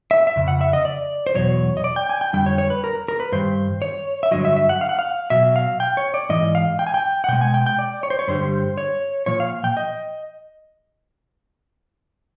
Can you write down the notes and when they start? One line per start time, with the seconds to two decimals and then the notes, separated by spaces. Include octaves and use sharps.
0.11 E5
0.27 E5
0.36 F2 C#3
0.48 F#5
0.61 E5
0.73 D#5
0.85 D5
1.27 C5
1.34 E2 B2 F#3 C#5
1.77 D#5
1.84 D5
1.96 G5
2.09 G#5
2.21 G5
2.33 F2 D3 G3 G5
2.46 C#5
2.58 C#5
2.70 B4
2.84 A#4
3.08 A#4
3.20 B4
3.32 G2 D#3 C5
3.82 C#5
4.23 E5
4.31 G2 D3 F#3 D#5
4.45 E5
4.57 E5
4.69 F#5
4.81 F5
4.89 F#5
4.99 F5
5.30 B2 F#3 E5
5.56 F5
5.80 G5
5.97 C#5
6.14 D5
6.29 G#2 E3 D#5
6.55 F5
6.79 G5
6.87 G#5
6.94 G5
7.24 F#5
7.28 B2 G#3 G5
7.41 G#5
7.54 G5
7.66 G5
7.79 D5
8.03 C#5
8.10 C5
8.19 C#5
8.28 G2 D3 G3 C5
8.78 C#5
9.26 A#2 F3 C#5
9.40 F5
9.64 G5
9.77 D#5